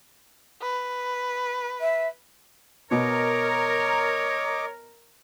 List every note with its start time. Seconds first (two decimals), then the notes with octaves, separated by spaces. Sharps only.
0.62 B4
1.81 E5
2.91 B2 A#4 C#5 D#5 D6